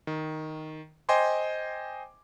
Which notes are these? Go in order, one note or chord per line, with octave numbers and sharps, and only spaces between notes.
D#3
C5 D#5 G5 G#5 C6 D6